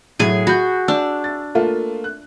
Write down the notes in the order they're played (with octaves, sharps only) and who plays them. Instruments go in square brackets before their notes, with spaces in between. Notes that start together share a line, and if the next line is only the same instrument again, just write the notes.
[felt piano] A2 F#3 [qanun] G#4 G#5
[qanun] F#4 [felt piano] B5 G6
[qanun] D4 [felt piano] E6
[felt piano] A6
A3 A#3 F4
F#6